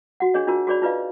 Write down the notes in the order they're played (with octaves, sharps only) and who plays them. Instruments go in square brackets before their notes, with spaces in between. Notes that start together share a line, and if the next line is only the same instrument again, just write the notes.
[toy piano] F#4 F#5
D4 G#4 C#5 D#5
D4 D#4 F4 F#4 A#4
F#4 G#4 C#5 D5 B5
D#4 F4 B4 D5 D#5 F5